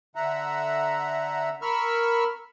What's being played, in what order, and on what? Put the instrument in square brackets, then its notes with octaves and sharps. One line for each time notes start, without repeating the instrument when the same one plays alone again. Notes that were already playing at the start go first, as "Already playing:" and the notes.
[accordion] D3 E5 F#5 A#5
A#4 B5 C#6 E6 F6